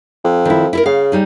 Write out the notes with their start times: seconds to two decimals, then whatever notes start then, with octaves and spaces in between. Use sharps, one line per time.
0.24 F2
0.45 D#3 E4
0.73 E4 A4 A#4
0.86 C#3 F5
1.12 G3 D#4 G#4